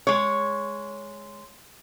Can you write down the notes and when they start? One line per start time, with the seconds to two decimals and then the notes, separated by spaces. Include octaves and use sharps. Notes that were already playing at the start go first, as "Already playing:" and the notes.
0.07 G#3 C#5